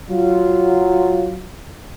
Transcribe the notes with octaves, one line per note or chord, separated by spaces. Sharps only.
F#3 F4